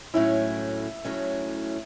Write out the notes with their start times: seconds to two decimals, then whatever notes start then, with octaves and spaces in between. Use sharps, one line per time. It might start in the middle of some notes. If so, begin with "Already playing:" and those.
0.14 A2 F#3 A3 C#4 E4
1.04 A2 F#3 A3 C#4